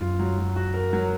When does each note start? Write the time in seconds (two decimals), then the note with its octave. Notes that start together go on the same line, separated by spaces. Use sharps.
0.01 F#2 F4
0.19 F#3
0.38 F#3
0.56 F#4
0.74 A#4
0.93 F#3